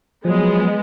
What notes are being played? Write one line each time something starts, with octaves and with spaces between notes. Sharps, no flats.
F3 F#3 G#3 B3